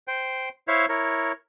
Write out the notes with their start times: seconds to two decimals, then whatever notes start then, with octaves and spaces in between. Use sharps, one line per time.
0.08 C5 G5
0.68 E4 C5 C#5 E5 F5
0.89 E4 A#4 C#5